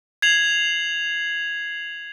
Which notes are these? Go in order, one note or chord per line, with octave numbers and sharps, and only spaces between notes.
G#6 C7 F7 F#7